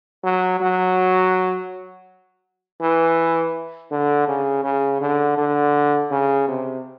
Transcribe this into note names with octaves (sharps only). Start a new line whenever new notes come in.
F#3
F#3
E3
D3
C#3
C#3
D3
D3
C#3
C3